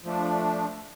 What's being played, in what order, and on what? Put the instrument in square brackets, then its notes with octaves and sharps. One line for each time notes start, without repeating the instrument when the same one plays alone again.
[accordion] F3 A3 D4